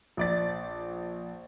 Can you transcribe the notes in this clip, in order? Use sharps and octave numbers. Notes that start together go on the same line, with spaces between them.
A#1 D5 A6